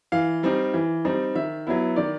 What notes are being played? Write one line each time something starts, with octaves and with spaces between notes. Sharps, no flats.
E3 F5
G3 C4 D#4
E3
G3 C4 D#4
D#3 E5
F#3 B3 E4
D#3 D5